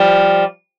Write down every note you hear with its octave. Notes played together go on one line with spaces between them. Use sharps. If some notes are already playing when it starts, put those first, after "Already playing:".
Already playing: F3 G3